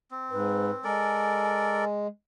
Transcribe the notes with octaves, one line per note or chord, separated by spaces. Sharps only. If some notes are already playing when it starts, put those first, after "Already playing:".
C4
G#2 B4
G#3 A4 A#4 D5 G#5